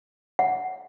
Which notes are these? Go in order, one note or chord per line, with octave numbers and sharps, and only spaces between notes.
F#5